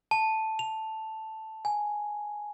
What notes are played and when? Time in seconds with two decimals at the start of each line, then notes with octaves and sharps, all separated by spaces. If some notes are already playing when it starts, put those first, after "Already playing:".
0.11 A5
0.59 F7
1.65 G#5